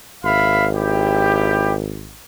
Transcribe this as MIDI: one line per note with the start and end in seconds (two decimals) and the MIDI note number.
0.24 2.21 32
0.24 0.66 76
0.24 0.66 77
0.24 0.66 83
0.73 1.72 64
0.73 1.72 67